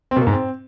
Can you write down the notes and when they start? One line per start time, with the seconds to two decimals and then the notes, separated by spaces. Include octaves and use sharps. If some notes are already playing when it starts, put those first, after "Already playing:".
0.11 C4
0.16 B2
0.22 A#3
0.27 G#2
0.32 C4